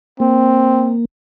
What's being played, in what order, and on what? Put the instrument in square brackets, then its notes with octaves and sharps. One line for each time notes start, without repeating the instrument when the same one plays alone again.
[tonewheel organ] A#3 [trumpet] C4